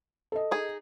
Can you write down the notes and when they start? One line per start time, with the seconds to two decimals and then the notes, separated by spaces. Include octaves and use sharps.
0.32 A4 D#5
0.51 D#4 G#4